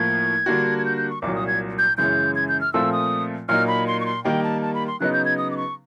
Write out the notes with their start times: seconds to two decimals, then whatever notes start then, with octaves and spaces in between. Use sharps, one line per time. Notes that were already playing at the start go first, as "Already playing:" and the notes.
Already playing: A2 F3 A#3 G#6
0.46 D3 G3 A#3 D4 F#4
0.78 G#6
0.85 G6
0.97 G6
1.10 C#6
1.22 C2 A#2 F#3 D6
1.35 D#6
1.47 G#6
1.78 G6
1.97 F#2 C#3 E3 G#3 C#4 G6
2.35 G#6
2.49 G6
2.61 F6
2.73 A#2 F3 A3 C4 F4 E6
2.93 D#6
3.49 A#2 F#3 A#3 D#4 F6
3.67 B5
3.87 C6
4.00 C#6
4.06 C6
4.24 D#3 G3 A#3 D#4 G5
4.43 A5
4.62 A5
4.75 B5
4.87 C6
5.00 C#3 F#3 B3 D#4 F#6
5.13 G6
5.25 G#6
5.38 D#6
5.51 D6
5.57 C#6